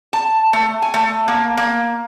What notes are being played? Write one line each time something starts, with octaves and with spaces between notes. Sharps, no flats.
A5
A3
G#5
A3
A#3
A#3